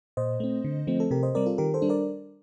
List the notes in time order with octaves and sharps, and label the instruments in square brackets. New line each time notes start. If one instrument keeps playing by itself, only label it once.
[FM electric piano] A#2 C5 D#5
A3 C4
D3
F3 A3 C4
A4
C3 G4 A#4
C5 D#5
G3 C4 A#4 D5
F4 A4
D#3 G4 A#4
A4 C5
G3 D4
A#4 D5